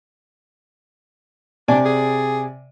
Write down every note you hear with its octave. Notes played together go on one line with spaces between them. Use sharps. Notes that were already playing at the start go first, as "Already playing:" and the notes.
C3 D4 D5 G#5
G#4